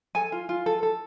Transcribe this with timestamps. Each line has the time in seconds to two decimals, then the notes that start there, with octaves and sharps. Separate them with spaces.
0.15 A4 G#5
0.32 F4
0.49 F4
0.66 A4
0.83 A4